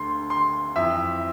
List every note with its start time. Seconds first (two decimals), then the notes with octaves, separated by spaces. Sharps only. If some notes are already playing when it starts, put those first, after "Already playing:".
Already playing: D2 D3 C6
0.30 C6
0.76 F2 E3 E5